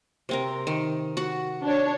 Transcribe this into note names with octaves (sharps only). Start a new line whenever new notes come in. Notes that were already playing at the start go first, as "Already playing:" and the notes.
C3 C4 A#4
D#3
F#4 F#5
D4 C#5